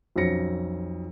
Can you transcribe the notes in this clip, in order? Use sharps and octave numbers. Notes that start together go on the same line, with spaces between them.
B1 F2 F#3 C#4 A#6 C#7